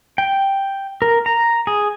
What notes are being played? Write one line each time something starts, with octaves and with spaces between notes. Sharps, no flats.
G5
A#4
A#5
G#4